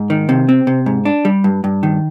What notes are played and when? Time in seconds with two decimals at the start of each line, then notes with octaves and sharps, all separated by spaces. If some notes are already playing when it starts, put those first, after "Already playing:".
Already playing: G#2
0.10 D#3
0.29 C3
0.49 C4
0.67 C3
0.86 G#2
1.05 D4
1.25 G3
1.44 G2
1.64 G2
1.83 D#3